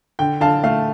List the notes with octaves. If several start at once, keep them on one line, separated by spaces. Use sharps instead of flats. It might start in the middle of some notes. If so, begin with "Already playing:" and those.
D3 G5
D3 F5 A5
A3 F5